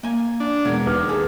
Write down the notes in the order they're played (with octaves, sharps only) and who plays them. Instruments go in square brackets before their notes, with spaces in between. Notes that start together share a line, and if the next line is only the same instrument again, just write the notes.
[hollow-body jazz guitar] A#3 G#5
[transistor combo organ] D4
[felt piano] E1 G#6 [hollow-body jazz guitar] B3 A#4
[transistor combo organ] D#2 [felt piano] B4 D6 F6
[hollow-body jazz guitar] G#4 A4